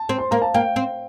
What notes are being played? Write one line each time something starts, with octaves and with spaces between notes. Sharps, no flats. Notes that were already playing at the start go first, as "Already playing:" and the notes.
Already playing: A5
C4
C6
A#3 A#5
A5
A#3 G5
C4